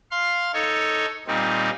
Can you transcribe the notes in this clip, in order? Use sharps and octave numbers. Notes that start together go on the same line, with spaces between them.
F5 C6
D#4 A4 C#5
A#2 G3 C4 D#4